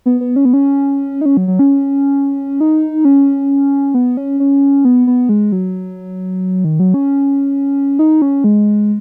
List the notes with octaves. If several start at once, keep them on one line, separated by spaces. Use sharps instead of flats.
B3
B3
C#4
B3
C#4
D#4
C#4
F#3
F#3
C#4
D#4
C#4
B3
C#4
C#4
B3
B3
G#3
F#3
D#3
F#3
C#4
D#4
C#4
G#3